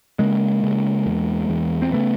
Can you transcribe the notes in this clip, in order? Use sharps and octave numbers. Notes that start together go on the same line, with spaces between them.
C#3 G#3 A#3
C#3
E2
E2
C4
C#3 A3 B3